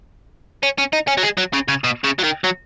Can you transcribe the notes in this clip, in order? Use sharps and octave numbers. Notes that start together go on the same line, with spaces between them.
C#4
C#4
D#4
C#4
F#3
G#3
F#3
C#3
C#3
B2
C#3
F#3
D#3
F#3